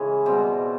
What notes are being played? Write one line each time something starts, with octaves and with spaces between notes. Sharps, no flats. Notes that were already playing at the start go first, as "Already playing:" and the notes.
Already playing: C#3 E3 G#3
B2 G3 C4